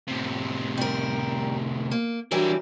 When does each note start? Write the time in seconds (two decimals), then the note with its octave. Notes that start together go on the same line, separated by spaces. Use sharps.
0.07 A2 C3
0.77 G3 A#4
1.91 A#3
2.31 E3 F#3 G3 D4 A#4